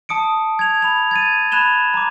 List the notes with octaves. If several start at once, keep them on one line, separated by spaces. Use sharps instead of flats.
A5 D#6 C#7 D7
G#6 F7
B5 F7
G#6 A6 D#7
B5 F#6 G#6 E7 F7 G7
A#5 D6